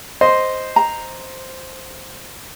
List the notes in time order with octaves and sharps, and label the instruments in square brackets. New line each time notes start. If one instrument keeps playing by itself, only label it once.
[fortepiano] C5 D#5 C6
[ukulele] A#5